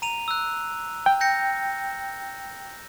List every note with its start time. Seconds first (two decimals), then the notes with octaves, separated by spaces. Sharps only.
0.02 A#5 D#7 F7
0.28 E6 F#6
1.06 G5
1.21 G6 A#6 C#7